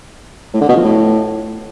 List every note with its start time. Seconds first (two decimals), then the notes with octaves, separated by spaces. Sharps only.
0.54 A2
0.61 D3
0.69 B2
0.76 F3
0.84 A2